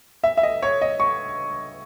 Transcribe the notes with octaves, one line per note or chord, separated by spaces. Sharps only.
E5
E5
D#5
C#5
D#5
C#6